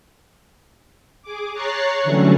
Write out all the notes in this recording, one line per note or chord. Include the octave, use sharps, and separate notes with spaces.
G#4 D6
C#5 A#5 C#6 F#6 A6 C7
D3 E3 F#3 G3 A3 C#4